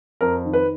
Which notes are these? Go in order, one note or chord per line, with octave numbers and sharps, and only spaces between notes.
F2 A#4
D#3
B4